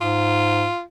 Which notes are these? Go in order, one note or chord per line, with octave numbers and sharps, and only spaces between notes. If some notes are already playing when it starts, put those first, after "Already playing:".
G#2 F4